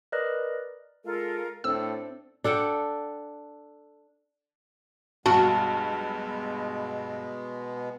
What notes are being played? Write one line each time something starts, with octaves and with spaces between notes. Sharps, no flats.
A#4 B4 D5 D#5 F#6
G#3 F4 A4 A#4
A2 C4 D4 A4 E6
D4 A4 F#5 G5
B1 G2 B2 G#3 B3 F#4 A5